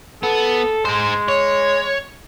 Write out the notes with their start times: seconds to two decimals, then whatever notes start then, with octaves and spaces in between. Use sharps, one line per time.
0.23 B3 A4
0.85 G#3 G#4 C5
1.28 C#5